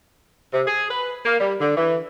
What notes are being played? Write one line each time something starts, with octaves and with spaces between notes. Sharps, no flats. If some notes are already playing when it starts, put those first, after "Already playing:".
C3
G#4
B4
A#3
G3
D3
E3